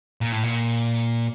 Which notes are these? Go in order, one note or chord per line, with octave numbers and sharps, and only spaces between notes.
A#2
A2
A#2